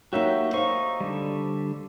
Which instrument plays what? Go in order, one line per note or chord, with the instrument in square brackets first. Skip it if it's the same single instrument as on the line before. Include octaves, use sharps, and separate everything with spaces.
[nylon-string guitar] F#3 A#3 D#4 [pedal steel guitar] F#4 G4 E5
[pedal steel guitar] D#4 C#6 [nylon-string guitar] C5 F5
[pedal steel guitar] D3 G3